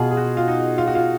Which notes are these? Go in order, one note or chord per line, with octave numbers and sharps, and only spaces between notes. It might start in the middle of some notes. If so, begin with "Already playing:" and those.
Already playing: B2 F4 G#4
G#4
F#4
F4
D#4
F4
F#4
F4